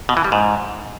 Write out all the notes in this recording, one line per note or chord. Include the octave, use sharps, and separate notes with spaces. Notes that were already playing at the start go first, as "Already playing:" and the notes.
B2
E3
G3
G#2